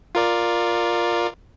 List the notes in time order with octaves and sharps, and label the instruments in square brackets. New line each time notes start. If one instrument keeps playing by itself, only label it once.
[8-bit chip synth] F4 A#4 D5